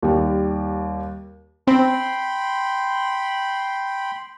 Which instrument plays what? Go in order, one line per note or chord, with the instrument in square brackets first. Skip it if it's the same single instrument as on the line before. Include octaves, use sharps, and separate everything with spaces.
[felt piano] D#2 G3
[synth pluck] C4 [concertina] G5 B5 C6